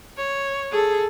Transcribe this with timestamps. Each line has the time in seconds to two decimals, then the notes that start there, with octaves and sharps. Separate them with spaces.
0.18 C#5
0.72 G#4 A4